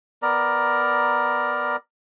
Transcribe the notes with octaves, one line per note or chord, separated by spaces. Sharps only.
B3 A#4 D5 A#5